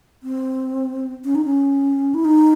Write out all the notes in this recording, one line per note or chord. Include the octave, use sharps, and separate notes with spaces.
C4
C#4
D#4
C#4
E4
D#4